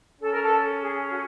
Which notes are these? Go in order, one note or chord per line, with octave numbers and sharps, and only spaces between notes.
C#4 A4
A#4
A4
G#4
F#4